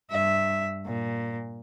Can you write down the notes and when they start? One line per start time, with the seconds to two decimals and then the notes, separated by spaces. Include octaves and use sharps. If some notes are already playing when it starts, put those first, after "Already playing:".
0.11 G2 E5
0.86 A#2